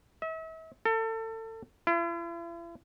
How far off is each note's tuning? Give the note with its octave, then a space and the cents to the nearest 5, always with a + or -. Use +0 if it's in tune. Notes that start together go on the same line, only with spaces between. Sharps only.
E5 -40
A4 +30
E4 +45